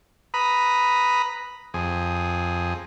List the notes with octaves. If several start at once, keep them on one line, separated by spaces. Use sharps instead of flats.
B4 A#5 B5 D#6
F2 G#4